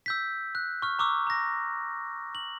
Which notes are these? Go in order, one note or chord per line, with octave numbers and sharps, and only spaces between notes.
E6 G6 B6
F#6
C#6 F6
A#5 C#6 D6 E6
A#5 A#6
F#7